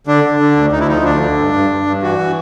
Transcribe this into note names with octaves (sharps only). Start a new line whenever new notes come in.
D3 D4
D3
D3
D2
D2 D#4
E4
F3 D#4
D2 D4
D3
G2
G2
G2
G2
E3 F#4
E3